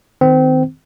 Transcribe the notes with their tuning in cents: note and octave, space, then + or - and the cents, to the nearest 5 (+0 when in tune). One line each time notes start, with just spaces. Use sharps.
D#3 +0 C4 -25